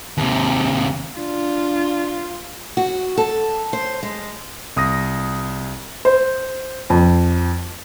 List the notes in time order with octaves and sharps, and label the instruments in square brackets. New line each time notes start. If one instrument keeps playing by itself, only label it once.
[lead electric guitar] D#2 C3
[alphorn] D4 [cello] F4
[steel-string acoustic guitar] F#4
A4
C5
G#3
[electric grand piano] C2 D#6 A#6
[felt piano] C5
F2